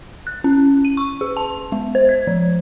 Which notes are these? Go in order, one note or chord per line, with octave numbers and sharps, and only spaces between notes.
F#6
C#4
D#7
C#6
G#4
A5
G#3
C5
G#6
F3